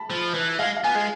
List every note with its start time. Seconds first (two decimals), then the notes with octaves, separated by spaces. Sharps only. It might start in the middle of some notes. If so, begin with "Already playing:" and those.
Already playing: A5 B5
0.10 F3
0.34 E3
0.59 G#3 F5
0.77 F5
0.84 B3 G#5
0.96 G#3